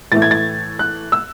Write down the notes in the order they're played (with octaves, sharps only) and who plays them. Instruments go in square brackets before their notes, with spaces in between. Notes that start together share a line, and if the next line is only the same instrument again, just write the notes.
[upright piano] A2 E3 A3 A6
G#6
A6
F#6
E6